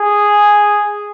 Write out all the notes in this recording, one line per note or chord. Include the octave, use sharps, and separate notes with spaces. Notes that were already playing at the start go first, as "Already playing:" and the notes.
Already playing: G#4